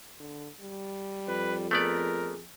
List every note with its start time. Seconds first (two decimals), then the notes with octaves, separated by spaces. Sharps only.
0.20 D3
0.60 G3
1.28 F2 B4
1.71 A3 B3 G#4 A#4 D5